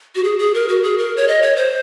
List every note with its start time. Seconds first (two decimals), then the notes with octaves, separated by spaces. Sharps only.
0.15 F#4
0.24 G#4
0.39 G#4
0.54 A#4
0.68 F#4
0.83 G#4
0.98 A#4
1.17 C#5
1.28 D#5
1.42 C#5
1.56 C5